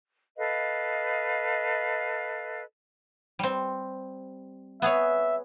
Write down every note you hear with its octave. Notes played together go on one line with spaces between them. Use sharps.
A4 B4 D#5 F5
G3 C4
B3 G#4 C#5 E5